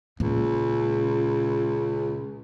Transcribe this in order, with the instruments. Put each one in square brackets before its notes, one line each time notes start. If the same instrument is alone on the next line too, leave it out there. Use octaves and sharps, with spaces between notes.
[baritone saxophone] C#2 [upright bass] A#2